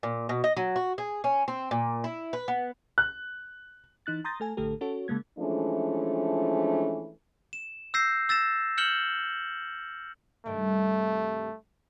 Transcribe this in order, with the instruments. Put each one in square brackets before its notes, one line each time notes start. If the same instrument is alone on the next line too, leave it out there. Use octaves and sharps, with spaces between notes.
[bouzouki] A#2
B2
D#5
F#3
F#4
G#4
C#4
C4
A#2
E4
B4
B3
[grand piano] F#6
[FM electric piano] E3 D#4 F#6 A6
A#5 C6 D#6 G6 A6 A#6
A3 A4 G#5
A1 D3 A3 G4 A4
C#4 F#4 A4 C#5
C#3 G#3 A#3 G#6
[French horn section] E3 F3 G#3 A3 C#4 D4
[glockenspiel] E7
E6 G6 A#6 C7
E6 A6 A#6 E7
F6 G6 C#7 E7 F#7 G7
[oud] G2 C3 D#3 [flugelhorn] A3